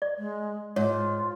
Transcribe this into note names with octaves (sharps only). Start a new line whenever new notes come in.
D5
G#3
G#2 F4 C#5